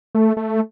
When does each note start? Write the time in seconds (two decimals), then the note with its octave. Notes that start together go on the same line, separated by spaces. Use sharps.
0.15 A3
0.37 A3